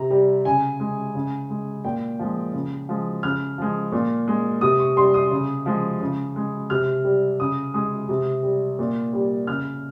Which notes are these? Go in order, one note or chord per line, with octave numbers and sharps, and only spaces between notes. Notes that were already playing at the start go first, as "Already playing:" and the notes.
Already playing: C3 A#5
G3
C#3 G#5
G#3
C#3
G#3
A#2 G5
F3 G#3
C#3
F3 G#3
C#3 F6
F3 G#3
A#2
G#3
C3 D#6
C#6
G3 C6
D#6
C#3
F3 G#3
C#3
G#3
C3 F6
G3
C#3 D#6
G#3 D#6
C3
G3
A#2
G3
C#3 F6